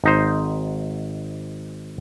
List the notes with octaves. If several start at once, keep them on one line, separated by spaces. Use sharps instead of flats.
G#1 D#4 C5